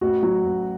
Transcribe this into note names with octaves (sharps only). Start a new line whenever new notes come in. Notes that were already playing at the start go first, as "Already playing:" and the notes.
A1 F#4
F#3
A1